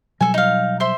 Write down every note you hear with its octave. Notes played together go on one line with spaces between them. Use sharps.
B2 F#3 G3 A4 G#5
D#4 F5
C5 E5 C6